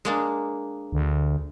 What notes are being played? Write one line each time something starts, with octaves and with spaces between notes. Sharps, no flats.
G#3 A#3 D4
D2